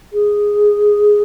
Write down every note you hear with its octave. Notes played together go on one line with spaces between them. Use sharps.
G#4